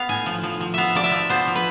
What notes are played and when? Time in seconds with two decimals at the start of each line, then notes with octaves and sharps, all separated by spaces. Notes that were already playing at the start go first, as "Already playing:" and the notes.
Already playing: B3 F5
0.09 A2 G#5
0.26 F3
0.43 F3
0.61 F3
0.74 B3 E5 F5
0.95 F3 D5
1.03 E5
1.12 F3
1.29 B3 C5
1.47 F3
1.55 B4